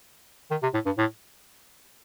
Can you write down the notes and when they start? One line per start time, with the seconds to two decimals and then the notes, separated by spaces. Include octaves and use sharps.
0.51 D#3
0.63 C3
0.74 A2
0.86 G2
0.98 A2